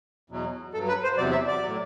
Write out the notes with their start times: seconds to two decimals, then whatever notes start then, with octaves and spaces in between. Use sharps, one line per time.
0.30 E2 B2 F#3
0.73 G2 A4
0.78 F#3
0.88 B4
1.03 C5
1.18 E2 C3 F#3 D5
1.32 E5
1.47 D5
1.62 A2 F#3